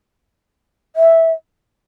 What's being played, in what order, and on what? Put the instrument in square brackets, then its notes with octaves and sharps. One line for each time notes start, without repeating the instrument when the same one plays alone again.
[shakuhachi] E5